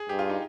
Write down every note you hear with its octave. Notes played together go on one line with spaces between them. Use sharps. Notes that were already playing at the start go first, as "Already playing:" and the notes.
Already playing: G#4
G2 G4
F4
D#4